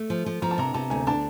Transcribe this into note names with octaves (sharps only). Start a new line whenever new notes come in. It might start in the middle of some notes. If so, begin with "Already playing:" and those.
Already playing: A3
F3
F3
F3 A#5
A5
C3 A#5
C3 A5
D2 G#5
D4 A5